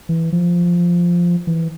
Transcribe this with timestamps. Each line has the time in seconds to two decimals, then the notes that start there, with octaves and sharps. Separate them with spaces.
0.09 E3
0.32 F3
1.47 E3